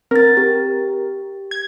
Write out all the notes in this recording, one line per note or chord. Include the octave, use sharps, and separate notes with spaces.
C4 A#4 A6
G4
G#6